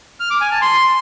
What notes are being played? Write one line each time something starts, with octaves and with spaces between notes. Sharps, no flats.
F6
D6
G#5
A5
C6